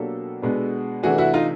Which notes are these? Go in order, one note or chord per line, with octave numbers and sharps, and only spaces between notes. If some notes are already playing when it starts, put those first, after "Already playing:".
Already playing: B2 F#3 A#3 D4 G4 A4
B2 G#3 B3 D4
C3 E3 A3 D4 F#4 G#4
E4 F#4
D#4 F4